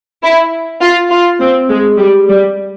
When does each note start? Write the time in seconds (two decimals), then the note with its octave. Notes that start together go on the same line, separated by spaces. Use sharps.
0.23 E4
0.82 F4
1.11 F4
1.40 C4
1.69 G#3
1.98 G3
2.28 G3